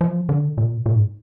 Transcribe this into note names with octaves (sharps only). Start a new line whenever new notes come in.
F3
D3
A#2
A#2
G#2